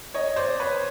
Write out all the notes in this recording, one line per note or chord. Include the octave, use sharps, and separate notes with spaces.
C#5 D#5
C5 D5
B4 C#5